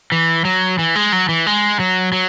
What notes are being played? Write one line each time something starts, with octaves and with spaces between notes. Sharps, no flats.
E3
F#3
E3
G#3
F#3
E3
G#3
F#3
F#3